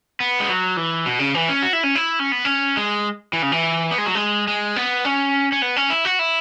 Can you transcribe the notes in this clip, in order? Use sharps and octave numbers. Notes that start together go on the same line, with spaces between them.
B3
G#3
F#3
E3
B2
C#3
E3
C#4
F#4
E4
C#4
E4
C#4
B3
C#4
G#3
E3
C#3
E3
B3
G#3
F#3
G#3
G#3
B3
C#4
C#4
B3
C#4
E4
F#4
E4